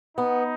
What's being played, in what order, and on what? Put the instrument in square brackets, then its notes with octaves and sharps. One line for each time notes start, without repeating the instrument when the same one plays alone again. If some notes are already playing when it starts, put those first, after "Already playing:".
[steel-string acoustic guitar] B3 [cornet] D#4